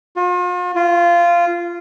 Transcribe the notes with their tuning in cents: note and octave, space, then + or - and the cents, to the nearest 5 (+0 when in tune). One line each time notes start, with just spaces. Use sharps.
F4 +40
F4 -15